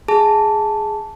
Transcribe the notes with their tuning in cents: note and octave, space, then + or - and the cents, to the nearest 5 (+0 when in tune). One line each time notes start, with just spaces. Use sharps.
G#4 +0 A5 +0